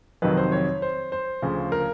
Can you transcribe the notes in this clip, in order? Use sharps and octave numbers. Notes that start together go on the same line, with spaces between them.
F2 C3 D#3 F#3 B4
C5
C#5
C5
C5
D2 C#3 F3
A#4